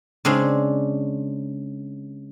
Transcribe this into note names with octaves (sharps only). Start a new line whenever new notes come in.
C#3 G#3 C4 D4